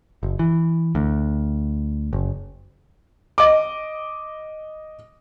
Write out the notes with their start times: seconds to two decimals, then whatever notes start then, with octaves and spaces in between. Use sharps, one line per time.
0.23 F#1
0.39 E3
0.95 D2
2.13 F#1
3.38 D#5 D6